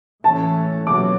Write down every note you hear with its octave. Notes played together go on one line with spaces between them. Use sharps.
A2 E3 A3 C#4 A5
B2 F#3 D6